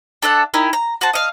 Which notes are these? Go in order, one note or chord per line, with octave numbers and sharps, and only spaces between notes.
D4 A4 E5 F#5
D#4 E4 G4 A#4
A#5
F#4 C5 A5
D#5 F5